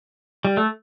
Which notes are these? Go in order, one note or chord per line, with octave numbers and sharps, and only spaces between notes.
G3
A3